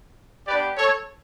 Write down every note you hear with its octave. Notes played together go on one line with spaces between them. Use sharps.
B3 D4 G4 B4 D5
A4 C#5